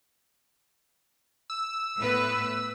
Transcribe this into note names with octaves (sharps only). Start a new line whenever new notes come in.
E6
A2 B3 B4